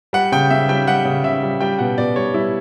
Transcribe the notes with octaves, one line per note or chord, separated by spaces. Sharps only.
G3 F#5
C#3 G5
C#3 E5
G3 G5
G3 F#5
C#3
C#3 E5
G3
G3 G5
B2 F#5
B2 D5
G3 C#5
G3 E4